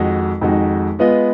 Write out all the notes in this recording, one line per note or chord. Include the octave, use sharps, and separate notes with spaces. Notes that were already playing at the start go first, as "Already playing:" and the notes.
Already playing: F2 D#3 G#3 D#4 F#4
F2 D#3 G#3 D#4 F#4
G#3 B3 F4 B4 D#5